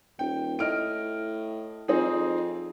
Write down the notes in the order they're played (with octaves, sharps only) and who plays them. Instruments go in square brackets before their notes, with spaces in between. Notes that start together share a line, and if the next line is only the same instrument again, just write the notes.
[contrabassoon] D#1 [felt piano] G5
[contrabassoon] A2 [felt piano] D#5 F6 D7
[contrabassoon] F2 [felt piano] C4 D#4 G#4